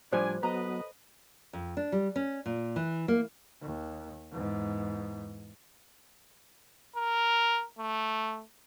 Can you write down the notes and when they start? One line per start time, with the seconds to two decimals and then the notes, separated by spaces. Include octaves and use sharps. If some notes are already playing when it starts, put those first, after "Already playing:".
0.12 A2 F3 G3 D4 C5 G#5
0.43 F#3 B3 A4 B4 D#5 A#5
1.53 F2
1.77 D4
1.92 G3
2.16 C#4
2.46 A#2
2.76 E3
3.08 A#3
3.62 D#2
4.32 E2 G#2
6.96 A#4
7.79 A3